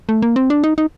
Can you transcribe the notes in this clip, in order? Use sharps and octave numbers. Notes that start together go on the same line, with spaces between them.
A3
A#3
C4
D4
D#4
D#4